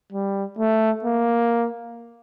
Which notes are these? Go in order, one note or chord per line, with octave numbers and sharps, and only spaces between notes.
G3
A3
A#3